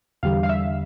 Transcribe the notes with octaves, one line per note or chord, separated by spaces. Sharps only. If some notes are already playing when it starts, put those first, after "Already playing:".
E2 D3 G3 F5
F5
E5